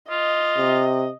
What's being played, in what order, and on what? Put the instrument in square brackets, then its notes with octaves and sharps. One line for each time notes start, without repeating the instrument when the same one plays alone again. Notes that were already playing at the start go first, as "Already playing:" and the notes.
[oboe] F4 [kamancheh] D#5
[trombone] C3